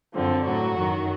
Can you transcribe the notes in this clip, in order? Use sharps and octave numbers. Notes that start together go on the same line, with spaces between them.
F#2 D3 F3 C4
A2 F#3 F#4
F#2 D#3 F#3